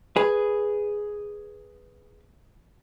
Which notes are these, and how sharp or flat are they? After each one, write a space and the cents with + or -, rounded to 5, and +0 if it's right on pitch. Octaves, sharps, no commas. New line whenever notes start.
G#4 +0 B4 +0